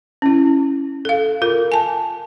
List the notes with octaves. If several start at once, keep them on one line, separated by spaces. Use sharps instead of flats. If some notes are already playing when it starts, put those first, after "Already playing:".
C#4 E4
A4 F5
F4 A#4
G#5 A5